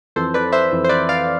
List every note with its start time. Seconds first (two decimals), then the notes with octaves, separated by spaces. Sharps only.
0.16 F2 E3 A4 C5
0.34 B4 D5
0.52 C5 E5
0.72 F2 E3
0.84 C5
0.89 B4 D5
1.09 D5 F5